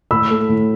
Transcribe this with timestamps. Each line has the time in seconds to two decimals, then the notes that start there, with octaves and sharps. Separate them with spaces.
0.11 A2 B5 E6
0.31 A3
0.49 A2